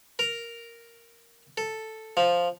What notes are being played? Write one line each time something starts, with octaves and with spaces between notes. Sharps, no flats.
A#4
A4
F3